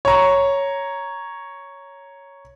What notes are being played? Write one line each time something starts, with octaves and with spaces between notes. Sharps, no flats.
C#5 A#5